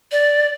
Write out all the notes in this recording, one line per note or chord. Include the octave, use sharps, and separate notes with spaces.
D5